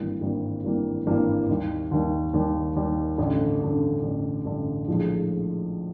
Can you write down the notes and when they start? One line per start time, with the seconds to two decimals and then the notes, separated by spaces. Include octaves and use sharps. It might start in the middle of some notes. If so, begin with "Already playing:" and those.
Already playing: G#1 G2 E3 G3 A#3
0.21 G#1 G2 E3 G3 A#3
0.64 G#1 G2 E3 G3 A#3
1.07 G#1 G2 E3 G3 A#3
1.49 D#2 D#3 G3
1.91 D#2 D#3 G3
2.34 D#2 D#3 G3
2.76 D#2 D#3 G3
3.18 A1 G2 D3
3.61 A1 G2 D3
4.03 A1 G2 D3
4.45 A1 G2 D3
4.88 A#1 A2 F3 G#3